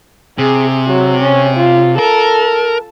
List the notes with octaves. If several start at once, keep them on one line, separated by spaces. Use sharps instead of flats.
C3 G#4
F#3
C#4
F4
A4 A#4